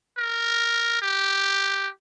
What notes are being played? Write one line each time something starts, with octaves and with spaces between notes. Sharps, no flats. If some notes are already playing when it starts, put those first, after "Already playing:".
A#4
G4